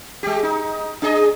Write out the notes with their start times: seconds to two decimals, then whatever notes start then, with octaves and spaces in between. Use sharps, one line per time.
0.23 G#3 G4
0.43 D#4
1.02 D4 G#4 D#5